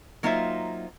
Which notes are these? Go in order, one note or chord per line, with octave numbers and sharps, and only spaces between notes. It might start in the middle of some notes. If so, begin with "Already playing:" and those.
F#3 A#3 D#4 F4 C5 E5